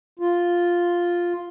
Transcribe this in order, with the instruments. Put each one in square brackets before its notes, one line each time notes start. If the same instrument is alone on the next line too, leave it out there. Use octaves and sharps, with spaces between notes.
[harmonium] F4